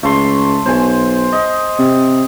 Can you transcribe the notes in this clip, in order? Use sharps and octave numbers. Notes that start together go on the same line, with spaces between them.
C#2 A3 C6
B1 C5 G#5
D#5
C3